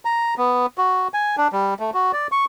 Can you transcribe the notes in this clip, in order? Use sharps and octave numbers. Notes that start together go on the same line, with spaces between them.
A#5
B3
F#4
G#5
D4
G3
A3
F#4
D5
C#6